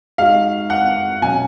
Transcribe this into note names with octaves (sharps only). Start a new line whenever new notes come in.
G#3 D#4 F#4 F5
F#5
B2 F#3 C#4 G#5